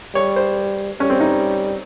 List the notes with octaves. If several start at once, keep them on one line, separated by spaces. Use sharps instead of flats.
G3 C#5
C5
G3 C#4
C4
D#4